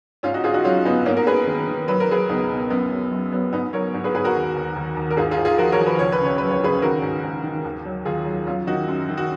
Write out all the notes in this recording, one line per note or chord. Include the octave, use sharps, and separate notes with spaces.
G#2 C#4 F4
D#4 F#4
G#2 F4 G#4
D#4 F#4
F#3 C#4 F4
G#2 B3 D#4
G#2 A#3 C#4
A#4
G#2 G#4 B4
D#3
D#3
F#3 B4
A#4
F#3 G#4 B4
C#2 B3 D#4
B2
F#2 B3
F#3
F#2
F#3 B3
G#2 B3 D#4
F#3 A#4 C#5
G#2
G#4 B4
G#2 G#4 B4
F#4 A#4
D#2
D#2
D#2
D#2
A#4
G#2 F4 G#4
F4 G#4
G#2
F4 G#4
F3 F#4 A#4
A#4 C#5
F3
B4
C#2 C#5
B4
C#3 C#5
F#3 B4
C#5
C#3 G#4 B4
D#3 F#4 A#4
G#2
G#2
D#3
D#2
F#3
D#2 F4 G#4
F#3
F#3 C#4 F4
D#3 D#4 F#4
F#2
D#3
F#4